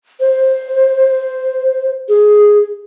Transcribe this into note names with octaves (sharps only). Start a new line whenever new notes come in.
C5
G#4